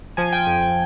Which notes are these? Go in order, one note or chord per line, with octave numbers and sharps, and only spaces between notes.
F3 G#5
G5
F2
G5